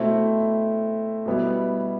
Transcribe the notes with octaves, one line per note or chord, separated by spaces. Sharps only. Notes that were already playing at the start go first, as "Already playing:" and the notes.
Already playing: B2 A3 C4 E4
B2 G3 B3 E4